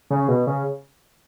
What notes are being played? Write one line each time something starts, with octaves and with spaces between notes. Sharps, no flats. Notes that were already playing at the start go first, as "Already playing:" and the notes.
C#3
B2
C#3